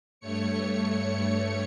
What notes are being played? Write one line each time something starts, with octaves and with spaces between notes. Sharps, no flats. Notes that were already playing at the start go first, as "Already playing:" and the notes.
G2 A3 C#5 C#7